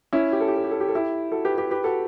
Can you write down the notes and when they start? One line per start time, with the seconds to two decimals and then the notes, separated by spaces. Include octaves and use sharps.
0.13 C#4 E4
0.32 G4
0.41 A4
0.48 G4
0.56 A4
0.64 G4
0.71 A4
0.80 G4
0.88 A4
0.95 E4 G4
1.32 F#4 A4
1.44 G4 B4
1.58 G4 B4
1.71 G4 B4
1.84 F#4 A4